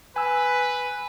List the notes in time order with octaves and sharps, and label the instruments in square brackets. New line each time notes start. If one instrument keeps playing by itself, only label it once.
[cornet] B4 [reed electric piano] G#5 E6